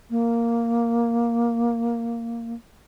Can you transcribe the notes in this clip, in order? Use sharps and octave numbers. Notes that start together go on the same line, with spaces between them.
A#3